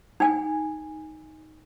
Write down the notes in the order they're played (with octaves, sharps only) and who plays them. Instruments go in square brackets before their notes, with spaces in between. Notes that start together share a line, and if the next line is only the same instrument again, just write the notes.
[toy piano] D#4 G#5